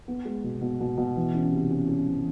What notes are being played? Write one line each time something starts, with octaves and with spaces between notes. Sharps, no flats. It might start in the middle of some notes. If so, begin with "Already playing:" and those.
B3
G#3
B2
B2
B2
B2
E3
C#4
C3
C#4
C#4
E3